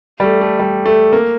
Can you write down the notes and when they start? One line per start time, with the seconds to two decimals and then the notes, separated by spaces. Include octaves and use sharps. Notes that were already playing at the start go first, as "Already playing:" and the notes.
0.20 G3
0.24 A3
0.41 A3
0.59 G3
0.86 A3
1.13 A#3